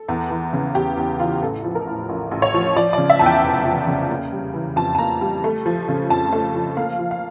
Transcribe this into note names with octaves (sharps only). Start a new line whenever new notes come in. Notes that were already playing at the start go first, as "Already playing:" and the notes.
Already playing: A4
E2
E3
C#3
E2 G4
E2
E3 F4
A1 A4
F3
A#4
A2
A1
A1
C#5
F3
F3 D5
C#3 D5
E5
E2 A5
G5
F1
F3
C#3
A#3
G3
E3
F2 A5
A5
A#3 A#5
G3
A3
F3
C#3
F2 A5
A3
F3
A#3 F5
F3
F5